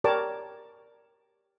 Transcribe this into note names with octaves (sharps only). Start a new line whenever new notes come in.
G4 A#4 C#5 D5 A5 D6